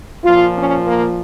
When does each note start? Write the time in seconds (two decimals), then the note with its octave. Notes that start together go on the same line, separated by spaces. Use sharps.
0.24 A#2 F3 F4
0.55 C#4
0.85 A#3